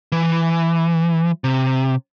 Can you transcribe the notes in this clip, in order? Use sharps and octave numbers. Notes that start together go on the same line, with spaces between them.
E3
C3